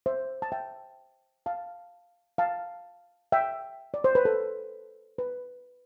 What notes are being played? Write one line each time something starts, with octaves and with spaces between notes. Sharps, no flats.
C5 E5
A5
E5 G5
F5 A5
F5 A5
E5 G5
D5
C5
B4
A4
B4